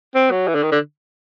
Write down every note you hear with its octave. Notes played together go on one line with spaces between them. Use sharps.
C4
F#3
E3
D3
D#3
D3